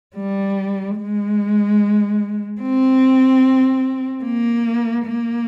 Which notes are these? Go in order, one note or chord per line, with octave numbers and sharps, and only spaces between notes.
G3
G#3
C4
A#3
A#3